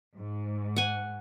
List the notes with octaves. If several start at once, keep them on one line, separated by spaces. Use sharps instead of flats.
G#2
F#5 G#5